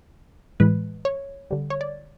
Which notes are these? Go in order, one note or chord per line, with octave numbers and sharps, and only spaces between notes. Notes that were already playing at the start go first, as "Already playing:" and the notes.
A2 E3 G#3 B4
C#5
D3 G3
C#5
D5